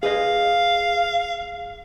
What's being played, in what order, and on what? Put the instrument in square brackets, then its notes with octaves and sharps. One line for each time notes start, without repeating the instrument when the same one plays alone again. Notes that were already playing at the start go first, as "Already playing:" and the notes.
[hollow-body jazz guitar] G#4 B4 D#5 [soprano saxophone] F5